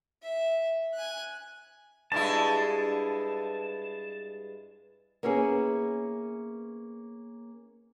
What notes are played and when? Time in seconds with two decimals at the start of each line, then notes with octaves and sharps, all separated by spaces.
0.23 E5
0.94 G#5 F#6
2.12 G2 G#3 E4 A5
5.23 A#3 B3 C#4 E4 G#4